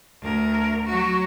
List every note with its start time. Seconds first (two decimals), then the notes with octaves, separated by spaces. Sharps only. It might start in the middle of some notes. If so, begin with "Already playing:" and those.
0.22 D2 A#4
0.86 F#3 F#4